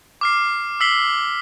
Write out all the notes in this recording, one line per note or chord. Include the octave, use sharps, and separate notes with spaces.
D6 F6 C7
E6 B6 C7 F#7 G7